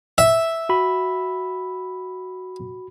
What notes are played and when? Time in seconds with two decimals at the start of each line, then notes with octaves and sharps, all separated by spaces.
0.18 E5
0.69 F#4 B5